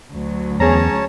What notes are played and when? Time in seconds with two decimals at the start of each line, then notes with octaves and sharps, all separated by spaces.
0.12 D2 F#3
0.60 E2 C#4 G#4 C#5 A5 A#5